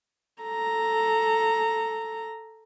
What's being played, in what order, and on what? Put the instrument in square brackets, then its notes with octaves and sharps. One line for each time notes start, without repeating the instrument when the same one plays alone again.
[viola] A4 A#5